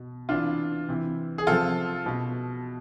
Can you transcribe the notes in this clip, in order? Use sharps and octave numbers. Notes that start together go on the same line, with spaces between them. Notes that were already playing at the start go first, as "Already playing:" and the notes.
Already playing: B2
C3 E3 D4 F4
C3 E3
G#4
C3 F3 F4 A4
B2